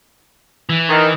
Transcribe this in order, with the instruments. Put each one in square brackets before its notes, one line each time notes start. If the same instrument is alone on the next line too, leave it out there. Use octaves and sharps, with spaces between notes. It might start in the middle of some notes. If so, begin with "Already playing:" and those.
[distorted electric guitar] E3
[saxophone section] D#3